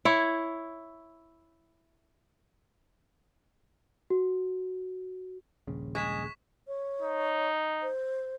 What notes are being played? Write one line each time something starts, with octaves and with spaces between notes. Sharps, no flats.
E4 C#5
F#4
D#1 A#1 C#3
G#3 C#6 B6 E7
C#5
D#4
C5